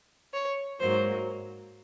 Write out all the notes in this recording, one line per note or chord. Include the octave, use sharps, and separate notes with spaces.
C#5
G#2 F#3 A#3 C5